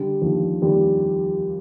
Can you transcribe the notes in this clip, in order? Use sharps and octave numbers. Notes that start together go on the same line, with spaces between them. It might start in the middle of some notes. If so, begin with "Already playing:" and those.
Already playing: D3 G3
D#2 F3
D#2 G3